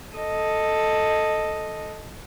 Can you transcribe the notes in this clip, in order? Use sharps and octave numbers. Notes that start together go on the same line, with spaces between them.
A4 D#5